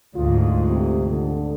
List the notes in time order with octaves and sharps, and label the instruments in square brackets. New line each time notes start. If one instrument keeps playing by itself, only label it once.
[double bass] D2 G#2 [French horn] F4
[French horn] C3
D3